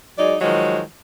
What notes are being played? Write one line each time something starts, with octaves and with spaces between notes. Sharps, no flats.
F#3 G#3 D#4 D5
D#3 F3 F#3 G#3